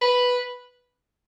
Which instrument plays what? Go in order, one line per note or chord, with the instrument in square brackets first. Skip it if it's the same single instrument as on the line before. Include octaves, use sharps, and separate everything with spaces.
[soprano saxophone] B4